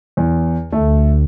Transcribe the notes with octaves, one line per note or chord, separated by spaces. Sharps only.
E2
D2 A3